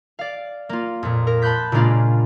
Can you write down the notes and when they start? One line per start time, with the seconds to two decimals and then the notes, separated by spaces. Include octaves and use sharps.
0.19 D5 F5
0.69 A#3 F4
1.03 F2 A#2
1.27 A#4
1.42 A5 B5 C6 F#6 G6 B6
1.72 A#2 C#3 G#3 A#3 D4 F4